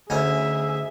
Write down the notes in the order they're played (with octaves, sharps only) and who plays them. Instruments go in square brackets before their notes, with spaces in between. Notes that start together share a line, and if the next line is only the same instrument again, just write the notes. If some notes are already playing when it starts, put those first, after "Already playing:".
[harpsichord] D2 C#4 D#4 [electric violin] G#4 E5